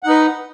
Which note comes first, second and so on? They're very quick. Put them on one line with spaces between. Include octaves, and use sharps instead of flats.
F#5 D#4 B4